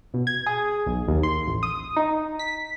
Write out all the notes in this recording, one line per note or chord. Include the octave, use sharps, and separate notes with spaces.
B2
G#6
G#4
B1
D#2
C6
A1
D#6
D#4
B6